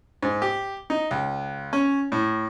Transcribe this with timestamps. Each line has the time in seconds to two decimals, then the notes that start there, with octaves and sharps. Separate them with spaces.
0.22 G#2
0.42 G4
0.90 D#4
1.11 C#2
1.73 C#4
2.12 A2